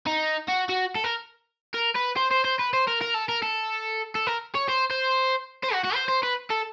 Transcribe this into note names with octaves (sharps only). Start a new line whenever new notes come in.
D#4
F#4
F#4
A4
A#4
A#4
B4
C5
C5
C5
B4
C5
A#4
A#4
A4
A#4
A4
A4
A#4
C#5
C5
C5
C5
F#4
F#4
C5
C5
B4
A4